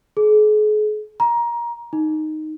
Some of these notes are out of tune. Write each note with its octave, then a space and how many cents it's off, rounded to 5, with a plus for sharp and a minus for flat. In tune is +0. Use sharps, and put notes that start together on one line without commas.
G#4 +40
A#5 +20
D#4 -5